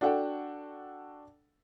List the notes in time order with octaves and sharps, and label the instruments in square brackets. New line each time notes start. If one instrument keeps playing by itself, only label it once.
[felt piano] D4 F#4 A4 F#5 G5